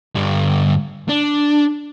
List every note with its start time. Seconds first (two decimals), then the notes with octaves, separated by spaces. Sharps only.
0.15 G2 D3
1.09 D4